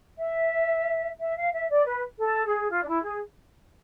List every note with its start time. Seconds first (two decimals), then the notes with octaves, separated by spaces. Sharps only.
0.19 E5
1.20 E5
1.36 F5
1.53 E5
1.70 D5
1.86 B4
2.20 A4
2.45 G#4
2.69 F4
2.83 D4
2.87 E4
3.03 G#4